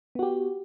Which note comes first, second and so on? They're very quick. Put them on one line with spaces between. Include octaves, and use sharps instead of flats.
B3 F#4 G4